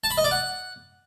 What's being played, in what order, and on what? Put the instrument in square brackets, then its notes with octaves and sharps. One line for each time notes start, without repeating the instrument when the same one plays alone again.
[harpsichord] A5
B5
D#5
D5
F#5